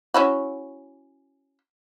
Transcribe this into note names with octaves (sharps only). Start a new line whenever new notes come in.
C#4 E4 F#4